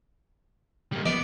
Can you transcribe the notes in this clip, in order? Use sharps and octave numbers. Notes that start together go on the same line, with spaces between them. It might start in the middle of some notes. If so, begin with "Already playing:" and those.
G3 A#3
B3 D5